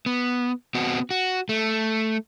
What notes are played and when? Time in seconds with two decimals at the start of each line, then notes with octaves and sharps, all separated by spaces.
0.06 B3
0.75 B3 C4 F#4
1.11 F#4
1.49 A3